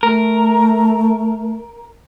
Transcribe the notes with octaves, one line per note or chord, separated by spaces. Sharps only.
A3 A#4